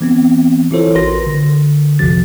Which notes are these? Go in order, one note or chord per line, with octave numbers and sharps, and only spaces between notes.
E3 B3 C4
E3 E4 F4 A4 C5 C#5
A1 F#4 A#4 B4 C6 A#6
D3
B1 F2 C3 F3 F#4 A6